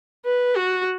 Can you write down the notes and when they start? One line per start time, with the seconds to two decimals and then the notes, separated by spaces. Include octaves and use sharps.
0.25 B4
0.56 F#4